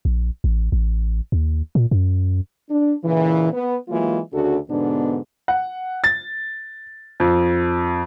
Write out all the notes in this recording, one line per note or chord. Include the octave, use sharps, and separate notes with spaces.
A#1
A1
A1
D#2
A#2
F#2
D4
A#2 C#3 E3
B3
E3 F#3 G#3 A#3 F4
D2 C#3 D4 F#4 A4
G#2 B2 D3 B3 D4
F#5
A6
F2